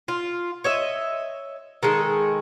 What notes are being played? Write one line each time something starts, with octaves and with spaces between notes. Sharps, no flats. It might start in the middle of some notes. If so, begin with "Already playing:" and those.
F4
C#5 D#5 E5
D#3 G#3 G#4 A4